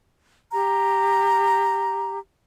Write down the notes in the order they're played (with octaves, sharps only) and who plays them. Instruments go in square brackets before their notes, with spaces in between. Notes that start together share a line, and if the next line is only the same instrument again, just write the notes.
[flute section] G4 A#5